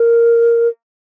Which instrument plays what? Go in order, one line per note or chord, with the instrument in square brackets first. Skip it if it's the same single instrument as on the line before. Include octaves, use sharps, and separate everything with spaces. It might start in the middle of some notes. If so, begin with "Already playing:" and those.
Already playing: [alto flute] A#4